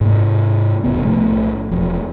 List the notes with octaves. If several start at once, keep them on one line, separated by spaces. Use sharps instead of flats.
G#2 C3 A#3
E1 D#2 C3 B3
B1 A2 F3 A3
E1 F3